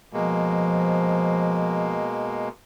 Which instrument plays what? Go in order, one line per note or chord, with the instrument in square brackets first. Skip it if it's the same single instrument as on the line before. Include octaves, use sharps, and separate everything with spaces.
[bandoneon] B2 G#3 A#3 [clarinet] F3